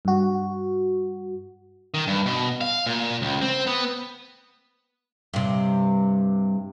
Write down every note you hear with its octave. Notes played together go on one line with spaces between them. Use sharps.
G2 F#4
D#3
G2
B2
F5
A#2
C#2
C4
B3
G2 C3